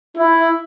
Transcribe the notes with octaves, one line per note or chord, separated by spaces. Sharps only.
E4